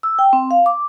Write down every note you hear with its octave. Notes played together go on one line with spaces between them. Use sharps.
E6
G5
C4
F5
D6